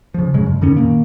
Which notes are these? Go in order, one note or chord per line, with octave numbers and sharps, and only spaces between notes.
C#3 F3
A#2 C#3 F#3 G#3
F#2
F#2 D3 D#3 C#4
A#2 D#3 A#3